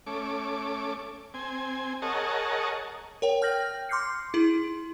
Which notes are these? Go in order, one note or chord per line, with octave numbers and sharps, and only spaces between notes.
A3 C#4 D6
C4 G#5
G#4 A#4 C#5 D#5 F#5 A5
A#4 C#5 G5
G5 F6 G6 A#6 F#7
C6 D6 F6 G6 C7 C#7
E4 G#4 C6 F#7